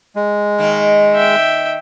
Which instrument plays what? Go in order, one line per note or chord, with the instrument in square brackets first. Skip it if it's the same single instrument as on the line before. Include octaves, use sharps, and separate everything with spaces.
[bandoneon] G#3
[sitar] D#3 A#3
[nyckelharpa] E5 G5